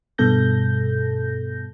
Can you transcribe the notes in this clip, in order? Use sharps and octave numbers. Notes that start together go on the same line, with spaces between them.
G2 B2 A4 G6 A#6